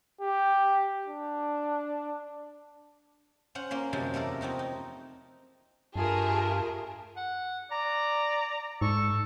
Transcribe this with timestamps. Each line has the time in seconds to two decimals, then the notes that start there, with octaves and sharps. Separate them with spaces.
0.21 G4
1.07 D4
3.55 C#4 C5 F#5
3.71 A#3 C#4 C6
3.93 F#2 C3 F3 G#3 A#3 C5
4.14 E2 A3 A#4 D5
4.41 F2 C4 D#4 F#4
4.59 D#4
5.95 G2 A3 F4 G4 G#4 A#4 G#5 A5
7.16 F#5
7.71 D5 A#5
8.82 G#2 A4 C#6